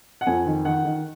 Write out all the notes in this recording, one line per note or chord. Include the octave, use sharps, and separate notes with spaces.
F#5
F2 G#5
D#3
D#3 F#5
D#3